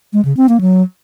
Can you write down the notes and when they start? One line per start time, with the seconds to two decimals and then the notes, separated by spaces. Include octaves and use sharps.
0.13 G#3
0.25 C#3
0.37 C4
0.49 A#3
0.61 F#3